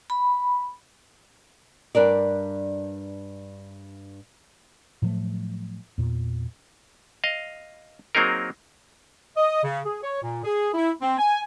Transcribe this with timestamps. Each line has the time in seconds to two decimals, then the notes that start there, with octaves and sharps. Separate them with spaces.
0.10 B5
1.95 G2 D4 A#4 D5
5.02 A2 F3 F#3 A3
5.98 E2 A#2
7.24 D#5 F5
8.15 F#3 A#3 C4 D#4 G#4 A#4
9.37 D#5
9.64 C#3
9.86 G#4
10.03 C#5
10.23 A#2
10.44 G#4
10.74 E4
11.01 C4
11.18 G#5